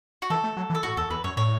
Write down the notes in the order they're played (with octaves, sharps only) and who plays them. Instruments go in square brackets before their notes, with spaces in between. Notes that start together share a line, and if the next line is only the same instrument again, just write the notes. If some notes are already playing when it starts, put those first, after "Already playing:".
[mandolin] F#4
[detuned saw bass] E3 [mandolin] A4
[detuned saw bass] A3
F#3
E3
[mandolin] A4
[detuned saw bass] A2 [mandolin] F#4
[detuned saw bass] E2 [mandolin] A4
[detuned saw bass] E2 [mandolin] B4
[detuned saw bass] F#2 [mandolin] C#5
[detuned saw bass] A2 [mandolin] C#5